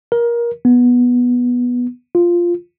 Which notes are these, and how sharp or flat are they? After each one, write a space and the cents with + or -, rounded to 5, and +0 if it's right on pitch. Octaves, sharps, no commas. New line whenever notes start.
A#4 +20
B3 -10
F4 -5